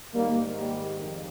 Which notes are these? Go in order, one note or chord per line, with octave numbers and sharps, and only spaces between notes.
G#2 D#3 G3 A#3
G3
F2